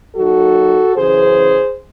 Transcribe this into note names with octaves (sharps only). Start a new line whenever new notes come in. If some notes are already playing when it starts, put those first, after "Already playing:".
D#2 D#3 F#3 F#4 A4
F#2 C#3 E3 G#4 C5